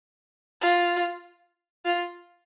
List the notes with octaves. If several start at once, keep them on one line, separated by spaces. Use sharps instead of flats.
F4
F4